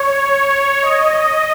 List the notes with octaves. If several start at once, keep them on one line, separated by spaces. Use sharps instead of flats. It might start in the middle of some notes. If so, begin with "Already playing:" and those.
Already playing: C#5
D#5